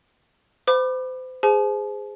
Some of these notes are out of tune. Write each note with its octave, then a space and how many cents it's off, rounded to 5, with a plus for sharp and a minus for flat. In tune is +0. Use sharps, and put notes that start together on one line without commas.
C5 -35 B5 +0 D6 +30
G#4 -10 C5 -25 A5 -45